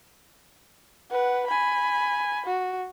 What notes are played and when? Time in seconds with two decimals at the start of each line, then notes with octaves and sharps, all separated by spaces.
1.11 B4 F#5
1.47 G#5 B5
2.46 F#4